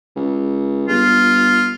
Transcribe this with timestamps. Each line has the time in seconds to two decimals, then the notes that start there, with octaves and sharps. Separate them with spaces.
0.16 C#2
0.88 G1 F4